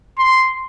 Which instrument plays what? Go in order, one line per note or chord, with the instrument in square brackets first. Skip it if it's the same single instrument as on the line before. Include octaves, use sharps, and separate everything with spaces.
[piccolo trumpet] C6